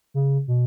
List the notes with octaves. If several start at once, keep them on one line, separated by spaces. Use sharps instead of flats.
C#3
B2